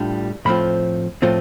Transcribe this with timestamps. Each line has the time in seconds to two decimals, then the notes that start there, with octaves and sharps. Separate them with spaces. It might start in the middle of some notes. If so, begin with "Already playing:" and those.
Already playing: A2 G3 D4 F4
0.45 A2 F3 A3 C4 F4 B5
1.22 A2 F3 A3 C4 F4